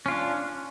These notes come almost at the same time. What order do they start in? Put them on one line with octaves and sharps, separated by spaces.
C#4 F4 D4